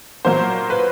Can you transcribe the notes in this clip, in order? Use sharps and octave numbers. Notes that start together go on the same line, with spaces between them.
A#2 F#3 A#3 C5
B4